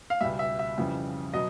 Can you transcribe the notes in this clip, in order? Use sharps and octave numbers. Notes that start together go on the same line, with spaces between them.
F5
C#2 B2 G3 E5
E5
E5
F2 C#3 E3 G3
B2 F#3 D#5